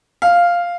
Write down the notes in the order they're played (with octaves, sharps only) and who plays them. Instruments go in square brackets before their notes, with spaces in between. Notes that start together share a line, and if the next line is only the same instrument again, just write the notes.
[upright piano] F5